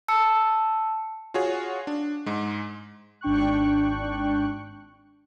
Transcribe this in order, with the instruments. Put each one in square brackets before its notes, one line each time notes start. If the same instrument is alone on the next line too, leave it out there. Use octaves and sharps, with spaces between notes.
[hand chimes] A5 E6 C#7
[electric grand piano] F4 F#4 G#4 C#5
D4
G#2 G#3
[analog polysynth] G#1 D4 G5 C#6 F#6